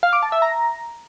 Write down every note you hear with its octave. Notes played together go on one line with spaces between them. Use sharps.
F5
D6
A5
E5
A#5